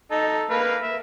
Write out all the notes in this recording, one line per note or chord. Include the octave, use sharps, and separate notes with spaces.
D#4 A4
A#3 B4 F5
E5